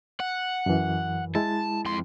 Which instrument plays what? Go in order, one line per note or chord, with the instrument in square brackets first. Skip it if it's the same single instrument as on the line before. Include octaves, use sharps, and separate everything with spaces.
[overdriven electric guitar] F#5
[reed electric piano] F#2 E3
[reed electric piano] G#3 E4 [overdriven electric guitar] A5
[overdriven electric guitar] F2 C6